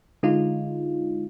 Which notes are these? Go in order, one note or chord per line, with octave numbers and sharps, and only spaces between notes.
D3 G#3 D#4 F4